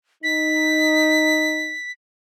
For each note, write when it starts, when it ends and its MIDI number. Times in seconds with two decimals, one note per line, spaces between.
0.23 1.76 63
0.23 1.92 95